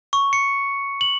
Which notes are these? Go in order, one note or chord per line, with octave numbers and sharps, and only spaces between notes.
C#6
C#7
F#7